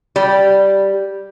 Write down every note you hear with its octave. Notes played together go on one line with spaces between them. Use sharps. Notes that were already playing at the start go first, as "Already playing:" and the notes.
G3